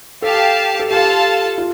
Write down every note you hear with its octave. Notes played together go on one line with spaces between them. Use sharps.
G4 A4 F5 A5
A4
F4 G4 A4 F5 A5
F4